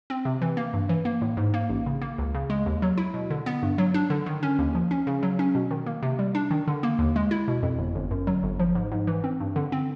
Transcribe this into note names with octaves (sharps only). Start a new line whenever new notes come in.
C4
C3
E3
A#3
G2
E3
A#3
A2
G#2
A#3
A1
C#3
A#3
C#2
C#3
G#3
D#2
F#3
E4
B2
D3
B3
G2
F#3
D4
D3
D#3
C#4
D#2
F3
C#4
C#3
F#3
C#4
B2
D#3
A#3
C3
G3
D4
D#3
D3
A#3
D#2
G#3
E4
B2
F2
G1
G1
F#2
F#3
G1
F3
G#2
G#2
E3
C4
G2
D3
C4